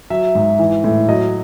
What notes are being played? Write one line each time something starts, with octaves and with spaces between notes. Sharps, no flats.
F#3 E5
G#2
E3
A2
F#3 D#5